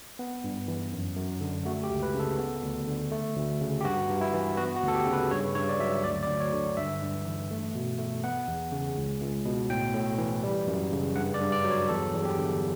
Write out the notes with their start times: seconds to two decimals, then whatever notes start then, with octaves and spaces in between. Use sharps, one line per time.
0.19 B3
0.44 G2
0.68 E3
0.92 F#2
1.16 F#2
1.41 D3
1.65 A3 F#4
1.84 G4
1.90 C#2
2.03 B4
2.14 C#3
2.20 A4
2.38 B3
2.63 D2
2.88 D3
3.12 A3
3.36 D2
3.61 C#3
3.81 G4
3.84 G2 F#4
4.10 G2
4.21 E4
4.34 E3
4.57 B3 F#4
4.76 F#4
4.83 D2
4.88 A4
4.95 G4
5.07 C#3
5.13 B4
5.31 G2 C#5
5.55 G2 C#5
5.69 D5
5.79 F#3 E5
6.04 D2 D5
6.23 D5
6.28 D2
6.40 C#5
6.53 D3
6.77 G2 E5
7.02 G2
7.26 E3
7.51 A3
7.75 B2
7.98 A3
8.24 B3 F#5
8.48 E2
8.72 C#3
8.97 C#2
9.21 C#2
9.45 B2
9.70 A2 G5
9.94 A2
10.18 E3
10.43 G3
10.67 F#2
10.92 C#3
11.16 G2 F#5
11.34 D5
11.40 G2
11.52 D5
11.64 F#3
11.71 C#5
11.89 E2 A4
12.14 E2
12.25 G4
12.38 D3